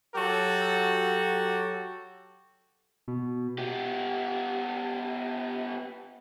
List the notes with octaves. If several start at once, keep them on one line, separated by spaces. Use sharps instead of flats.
F#3 F#4 G4 A4
B2
B3 G4